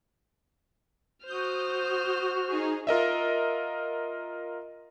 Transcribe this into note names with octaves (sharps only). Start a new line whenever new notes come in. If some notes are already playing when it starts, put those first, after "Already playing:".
F#4 C5 D#6 F6 G6
D#4 G#4
F4 A#4 D#5 E5